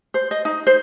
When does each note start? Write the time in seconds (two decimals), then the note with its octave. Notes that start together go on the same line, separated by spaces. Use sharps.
0.14 C5
0.31 D#5
0.45 D#4
0.67 C5